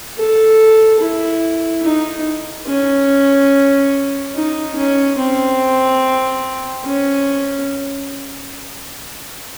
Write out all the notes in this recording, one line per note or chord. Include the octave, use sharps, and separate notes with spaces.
A4
E4
D#4
C#4
D#4
C#4
C4
C#4